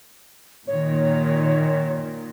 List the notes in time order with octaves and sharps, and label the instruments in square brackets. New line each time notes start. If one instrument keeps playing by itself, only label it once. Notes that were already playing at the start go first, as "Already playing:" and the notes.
[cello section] A#2 D#3 [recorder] C#5